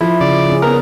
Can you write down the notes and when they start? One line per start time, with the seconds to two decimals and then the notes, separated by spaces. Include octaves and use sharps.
0.01 F3 E4
0.21 C#3 D5
0.50 C#4 G#4
0.62 B3 A#4 A#5